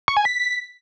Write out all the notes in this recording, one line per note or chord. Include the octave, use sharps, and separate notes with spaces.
C#6
G#5
B6